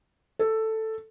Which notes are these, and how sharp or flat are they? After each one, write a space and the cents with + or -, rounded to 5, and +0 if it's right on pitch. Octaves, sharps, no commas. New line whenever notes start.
A4 +5